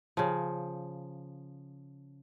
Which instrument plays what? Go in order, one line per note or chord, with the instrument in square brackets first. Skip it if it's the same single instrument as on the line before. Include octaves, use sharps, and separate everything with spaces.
[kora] C#3 F3